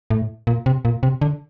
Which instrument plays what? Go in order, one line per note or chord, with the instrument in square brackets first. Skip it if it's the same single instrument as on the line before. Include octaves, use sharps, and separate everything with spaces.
[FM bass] A2
A#2
C3
A#2
C3
D3